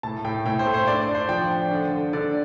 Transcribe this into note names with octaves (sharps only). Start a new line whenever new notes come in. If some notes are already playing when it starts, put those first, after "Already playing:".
A2 A5
A2 G5
A2 G5
C5
A3
C5
D4 D5
D5
D4
C5
F3 G5
D4
D3
D3
D3 D5